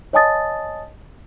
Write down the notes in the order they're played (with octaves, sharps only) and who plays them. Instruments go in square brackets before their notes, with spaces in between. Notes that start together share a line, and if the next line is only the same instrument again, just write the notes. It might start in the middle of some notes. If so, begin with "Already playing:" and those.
[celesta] C#5 D#5 G#5 A5 D#6 A6